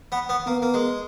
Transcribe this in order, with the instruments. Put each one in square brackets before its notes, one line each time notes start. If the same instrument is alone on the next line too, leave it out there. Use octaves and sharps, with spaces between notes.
[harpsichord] B3
B3
[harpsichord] A#3 [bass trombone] B3
[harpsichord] A#3
G#3